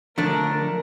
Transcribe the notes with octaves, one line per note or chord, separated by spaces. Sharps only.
D3 F3 A3 D4 A#4